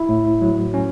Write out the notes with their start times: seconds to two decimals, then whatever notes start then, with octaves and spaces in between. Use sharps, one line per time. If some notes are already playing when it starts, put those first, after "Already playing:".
Already playing: E4
0.09 A2
0.41 F#3
0.74 C#4